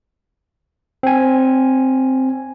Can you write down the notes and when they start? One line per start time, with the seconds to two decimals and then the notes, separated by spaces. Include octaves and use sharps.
1.03 C4 G#5